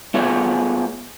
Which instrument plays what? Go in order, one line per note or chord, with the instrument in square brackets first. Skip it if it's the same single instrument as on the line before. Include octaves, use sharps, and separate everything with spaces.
[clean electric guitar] A3 B3 F4 G#4 C#5